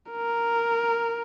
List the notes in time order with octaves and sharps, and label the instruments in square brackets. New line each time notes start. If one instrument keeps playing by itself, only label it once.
[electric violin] A#4